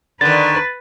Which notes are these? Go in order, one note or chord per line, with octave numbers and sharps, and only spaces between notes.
D3 D#3 B4 A6